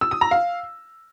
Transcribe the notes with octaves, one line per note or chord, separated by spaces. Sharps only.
E6
D#6
A#5
F5